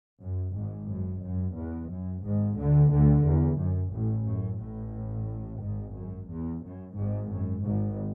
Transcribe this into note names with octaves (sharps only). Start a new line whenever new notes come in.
F#2
G#1 G#2
F#2
F#2
E2
F#2
G#1 G#2
D2 D3
D2 D3
E2
F#2
A1 A2
F#2
A1 A2
G#1 G#2
F#2
E2
F#2
G#1 G#2
F#2
G#1 G#2